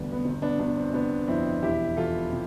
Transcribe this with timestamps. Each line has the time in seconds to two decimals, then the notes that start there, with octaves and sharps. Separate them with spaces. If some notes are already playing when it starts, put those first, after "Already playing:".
Already playing: E1 D2 D3 G3 B3 D4
0.12 B3
0.24 G1 C4
0.42 B3 D4
0.59 G1 B3 D4
0.77 C4
0.93 C3 B3 D4
1.28 F2 C4 E4
1.63 E1 E4 G4
1.97 E3 F4 A4
2.32 C3